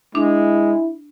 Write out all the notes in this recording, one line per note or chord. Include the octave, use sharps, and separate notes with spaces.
G#3 D4 E4